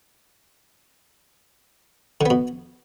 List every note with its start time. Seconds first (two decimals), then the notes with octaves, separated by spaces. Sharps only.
2.21 D3
2.26 B3
2.30 B2